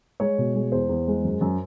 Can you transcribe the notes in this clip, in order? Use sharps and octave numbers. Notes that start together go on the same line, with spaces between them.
G#3 C#5
B2
G#3
E2 C5
E2
G#3
F#2
F#2